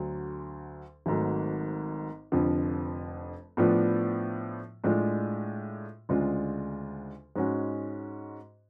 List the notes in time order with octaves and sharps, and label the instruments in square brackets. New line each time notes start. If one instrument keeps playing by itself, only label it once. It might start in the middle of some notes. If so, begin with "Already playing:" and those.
Already playing: [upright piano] D2 D3 F#3
G#1 G#2 F#3 A3
F1 F2 D3 F3
A2 F3 B3 D4 F4
A2 G#3 D4 F4
D2 C#3 G#3 D4 F4
G#2 G#3 C#4 F#4